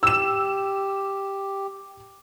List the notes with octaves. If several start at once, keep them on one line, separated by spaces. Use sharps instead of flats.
G4 E6 E7